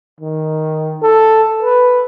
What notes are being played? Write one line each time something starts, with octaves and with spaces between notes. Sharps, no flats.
D#3
A4
B4